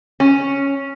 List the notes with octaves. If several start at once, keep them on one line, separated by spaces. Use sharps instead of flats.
C#4